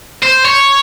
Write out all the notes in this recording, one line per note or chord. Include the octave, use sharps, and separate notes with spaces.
C5
C#5